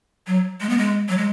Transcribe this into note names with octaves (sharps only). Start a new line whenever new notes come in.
F#3
G#3
B3
G#3
F#3
G#3